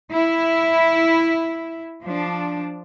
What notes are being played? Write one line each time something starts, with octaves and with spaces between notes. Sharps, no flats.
E4
F3 D4